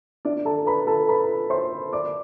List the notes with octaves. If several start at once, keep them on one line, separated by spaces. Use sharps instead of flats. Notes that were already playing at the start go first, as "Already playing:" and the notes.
D4 D5
A4 A5
B4 B5
A4 A5
B4 B5
C5 C6
D5 D6